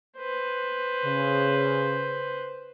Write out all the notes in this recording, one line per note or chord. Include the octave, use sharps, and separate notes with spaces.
B4 C5
C#3